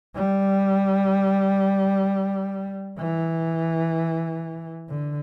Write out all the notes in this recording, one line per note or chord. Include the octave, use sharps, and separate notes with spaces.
G3
E3
D3